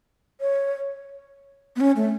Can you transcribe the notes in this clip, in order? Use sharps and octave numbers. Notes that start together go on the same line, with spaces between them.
C#5
B3
C#4
A3